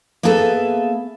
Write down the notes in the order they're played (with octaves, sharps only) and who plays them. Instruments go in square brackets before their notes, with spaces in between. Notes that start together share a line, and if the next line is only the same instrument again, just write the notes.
[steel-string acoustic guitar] A#3 B3 G#4 A4 B4 E5